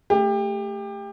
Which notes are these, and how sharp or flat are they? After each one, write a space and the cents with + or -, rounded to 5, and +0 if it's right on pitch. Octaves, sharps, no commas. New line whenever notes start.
A3 +0 G4 +25